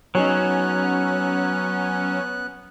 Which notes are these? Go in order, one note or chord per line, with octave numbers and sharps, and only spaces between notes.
F#3 B3 C#4 D#4 G#4 C#5 F#6